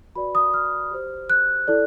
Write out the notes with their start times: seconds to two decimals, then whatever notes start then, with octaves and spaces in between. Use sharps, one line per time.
0.15 F#4 B4 D5 B5
0.35 D#6
0.54 F6
0.91 G4 C5
1.30 F#6
1.68 E4 A4 D5